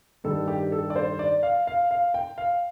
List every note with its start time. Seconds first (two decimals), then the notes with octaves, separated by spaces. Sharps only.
0.24 G2 D#3 G3 A4
0.48 G4
0.72 A4
0.90 D5
0.96 C5
1.19 D5
1.43 F5
1.67 F5
1.91 F5
2.14 G5
2.38 F5